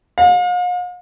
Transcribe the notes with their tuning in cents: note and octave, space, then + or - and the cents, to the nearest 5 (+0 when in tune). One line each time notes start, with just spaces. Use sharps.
F5 +45